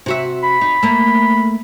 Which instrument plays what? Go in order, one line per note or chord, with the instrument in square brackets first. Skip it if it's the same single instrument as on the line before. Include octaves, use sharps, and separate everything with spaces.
[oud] C3 F#4 E5
[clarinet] B5
[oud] D#4
A3 A#3